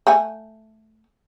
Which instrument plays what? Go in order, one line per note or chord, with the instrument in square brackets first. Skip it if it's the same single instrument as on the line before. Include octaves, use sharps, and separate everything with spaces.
[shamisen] A3 F#5 G#5